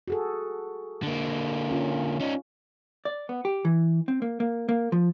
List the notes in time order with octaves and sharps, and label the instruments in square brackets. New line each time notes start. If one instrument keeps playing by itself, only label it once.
[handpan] F#4 G#4 A4
[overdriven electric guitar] D3 A#3
[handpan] C#4 F4
[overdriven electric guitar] C#4 D#4
[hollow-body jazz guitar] D5
B3
G4
E3
C4
A#3
A#3
A#3
F3